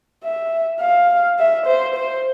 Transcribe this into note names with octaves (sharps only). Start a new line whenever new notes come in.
E5
F5
E5
C5
C5